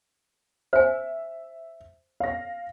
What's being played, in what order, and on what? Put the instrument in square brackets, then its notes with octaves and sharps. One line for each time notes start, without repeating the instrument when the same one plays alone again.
[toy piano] C5 G#5 [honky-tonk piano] E5
[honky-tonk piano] F5 A#6